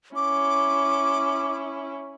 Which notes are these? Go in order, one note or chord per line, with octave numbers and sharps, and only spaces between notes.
C#4 E4 D6